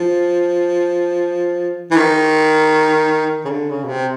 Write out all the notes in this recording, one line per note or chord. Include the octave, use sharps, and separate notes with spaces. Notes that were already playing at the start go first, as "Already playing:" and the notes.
Already playing: F3
E3
D#3
C#3
D3
C#3
B2
C3